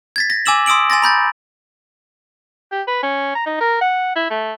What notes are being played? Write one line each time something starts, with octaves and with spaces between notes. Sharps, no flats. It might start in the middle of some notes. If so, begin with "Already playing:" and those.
G#6 A6 B6
A#6
G#5 D6 E6 E7 F#7
C6 D#6 E6 D7 F#7
G#5 C6 A6 A#6
A#5 B5 G6 A6
G4
B4
C#4
A#5
D#4
A#4
F#5
E4
A3